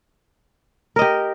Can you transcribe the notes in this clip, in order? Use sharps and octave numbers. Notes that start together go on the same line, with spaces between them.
G4 A#4 D#5